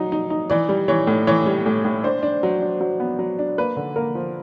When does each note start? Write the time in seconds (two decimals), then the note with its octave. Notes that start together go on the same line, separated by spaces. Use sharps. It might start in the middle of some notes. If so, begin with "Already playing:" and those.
Already playing: F#3 D#4
0.12 D#4
0.30 D#4
0.50 E3 D5
0.69 G3
0.88 E3 C#5
1.07 A2
1.27 E3 C#5
1.46 G3
1.66 A2
1.85 A2
2.04 D4 C5
2.23 D4
2.43 F#3
2.61 D4
2.81 F#3
3.00 B3
3.19 F#3
3.39 D4
3.58 A#3 B4
3.77 D3
3.96 A#3 A#4
4.15 F3